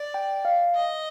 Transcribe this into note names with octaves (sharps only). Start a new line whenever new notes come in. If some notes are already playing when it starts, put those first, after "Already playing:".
Already playing: D5
G5
F5
D#5